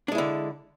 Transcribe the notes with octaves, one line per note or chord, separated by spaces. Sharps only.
D3 G#3 D4 E4